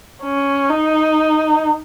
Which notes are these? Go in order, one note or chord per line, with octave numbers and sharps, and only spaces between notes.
C#4
D#4